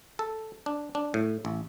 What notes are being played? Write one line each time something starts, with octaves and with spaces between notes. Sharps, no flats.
A4
D4
D4
A2
A1